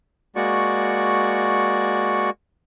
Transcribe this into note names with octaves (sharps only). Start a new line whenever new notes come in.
G#3 A#3 F#4 D5 C#6